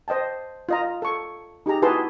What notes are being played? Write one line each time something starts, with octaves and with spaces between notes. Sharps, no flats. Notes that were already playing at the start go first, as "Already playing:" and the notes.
C5 D#5 G5 A5
F4 D#5 A#5
A4 C#6
D#4 G4 G#4 A#5
E4 F#4 G#4 B4 A5 C6